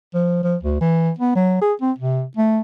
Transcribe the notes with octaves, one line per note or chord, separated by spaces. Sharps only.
F3
F3
D2
E3
B3
F#3
G#4
C4
C3
A3